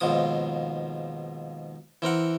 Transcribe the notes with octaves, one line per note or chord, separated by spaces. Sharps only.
D#2 G#2 B2 F3 D#6
E3 C4 A#4 F#5